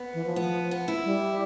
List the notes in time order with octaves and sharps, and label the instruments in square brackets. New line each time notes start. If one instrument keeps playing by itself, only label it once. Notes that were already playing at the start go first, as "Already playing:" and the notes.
Already playing: [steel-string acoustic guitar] B3
[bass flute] E3
F3
[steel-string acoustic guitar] B3
B3
E4
[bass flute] G3